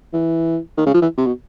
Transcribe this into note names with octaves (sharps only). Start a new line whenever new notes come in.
E3
D#3
C#3
F3
E3
C3
B2